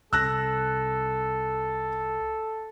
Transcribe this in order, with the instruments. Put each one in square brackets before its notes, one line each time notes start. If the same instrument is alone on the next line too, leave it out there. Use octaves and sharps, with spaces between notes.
[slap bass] C2 [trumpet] A4 [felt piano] E6 F#6 A#6